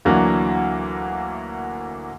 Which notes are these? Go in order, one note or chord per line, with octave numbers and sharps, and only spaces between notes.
D2 E3 F#3 A#3 D4